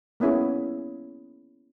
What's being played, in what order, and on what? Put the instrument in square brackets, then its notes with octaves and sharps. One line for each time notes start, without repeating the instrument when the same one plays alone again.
[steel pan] A#3 B3 C#4 E4 G#4